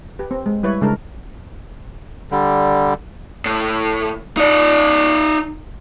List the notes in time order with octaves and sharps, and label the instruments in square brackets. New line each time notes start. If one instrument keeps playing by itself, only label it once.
[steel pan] G4 B4
C4
G#3
G3 E4 B4 C#5
C#3 G#3 D4 A4 A#4
[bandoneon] D3 G3
[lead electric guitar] A2
D#4 D5